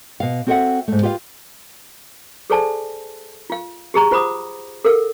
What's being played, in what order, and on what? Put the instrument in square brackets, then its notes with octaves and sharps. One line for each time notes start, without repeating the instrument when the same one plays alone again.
[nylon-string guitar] B2 F5
C4 F#4 A4 D5 E5 F#5
G#2 A3
F4 G4 B4 E5 F5
[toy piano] G#4 A4 C5 D5 G#5 A5
F4 F5
G4 G#4 A#5 C#6
F4 C5 F#5 B5 D6 D#6
A4 A#4 F5 F#5